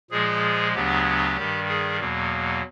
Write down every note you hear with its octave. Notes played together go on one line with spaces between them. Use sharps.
A#2 F3 G#3 G#4
D2 C#3 F#3 B3 D4 G4
G2 D#3 G3
G#4
E2 B2 F#3 A#3